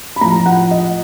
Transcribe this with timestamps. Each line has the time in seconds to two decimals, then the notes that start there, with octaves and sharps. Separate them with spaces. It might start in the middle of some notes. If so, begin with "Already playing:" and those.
0.16 B5
0.21 A2 F3 A#5
0.46 F#5
0.71 D#5